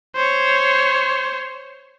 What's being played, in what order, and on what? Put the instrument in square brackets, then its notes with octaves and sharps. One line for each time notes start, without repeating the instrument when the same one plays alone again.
[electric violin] C5 C#5